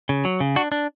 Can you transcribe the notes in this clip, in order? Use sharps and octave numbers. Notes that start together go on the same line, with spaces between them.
C#3
F#3
C#3
D4 F#4
D4